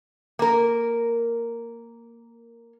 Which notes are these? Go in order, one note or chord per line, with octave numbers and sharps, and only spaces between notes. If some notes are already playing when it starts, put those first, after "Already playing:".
A#3 A#4